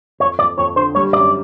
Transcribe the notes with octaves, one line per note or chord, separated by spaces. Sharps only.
F2 C#5
F2 D5
F2 C#5
D3 C5
G3 C#5
F#2 D5